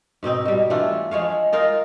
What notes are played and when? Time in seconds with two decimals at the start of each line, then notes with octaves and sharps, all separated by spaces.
0.23 G#2 B2 C4 D#4
0.45 B2 G3
0.70 E3 A3 D4 F4
1.11 F3 G#3 C#5 F5
1.53 D#4 F4 A#4 F5